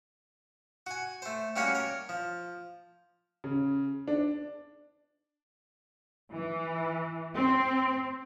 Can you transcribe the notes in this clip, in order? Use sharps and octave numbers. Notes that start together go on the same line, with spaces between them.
F#4 G#5
A3 C5
G3 A#3 C#4 F#4 A#4 C#5
A#4 C#5
F3
C#3
D4
E3
C4